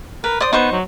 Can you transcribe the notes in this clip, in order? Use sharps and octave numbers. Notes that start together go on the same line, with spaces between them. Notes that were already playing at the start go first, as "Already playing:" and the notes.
A#4 B4
C5 D5 D#6
B3 D#4 C5 C#6
F#3